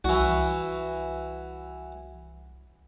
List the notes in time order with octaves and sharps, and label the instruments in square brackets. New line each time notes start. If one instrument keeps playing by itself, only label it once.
[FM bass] C2 [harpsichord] E3 F#4